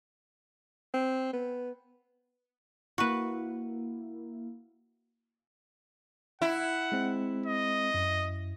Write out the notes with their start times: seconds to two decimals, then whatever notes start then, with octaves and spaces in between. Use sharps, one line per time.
0.94 C4
1.33 B3
2.98 A#3 E4 F#4 B4
6.42 E4 F#5
6.92 G#3 C4
7.46 D#5
7.94 F#2